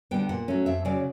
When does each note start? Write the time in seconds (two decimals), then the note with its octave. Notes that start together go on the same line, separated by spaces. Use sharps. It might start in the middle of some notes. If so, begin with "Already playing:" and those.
0.11 D3 G3 B3 G5
0.29 A#2 F#5
0.48 F#3 A3 C#4
0.66 F2 E5
0.85 C#3 F#3 D5